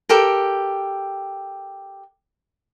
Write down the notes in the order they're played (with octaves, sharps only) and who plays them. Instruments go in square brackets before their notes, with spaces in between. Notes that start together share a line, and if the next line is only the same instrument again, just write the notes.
[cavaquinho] G4 A4 A#4